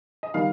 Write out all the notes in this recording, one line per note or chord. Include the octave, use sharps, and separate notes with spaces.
D#5
D#3 G3 F5